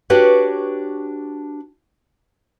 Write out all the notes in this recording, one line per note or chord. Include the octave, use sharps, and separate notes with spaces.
D4 F#4 G4 B4 C#5